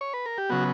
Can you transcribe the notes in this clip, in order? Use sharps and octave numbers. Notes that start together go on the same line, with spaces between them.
C#5
B4
A#4
G4
C#3 F#3 B3 F#4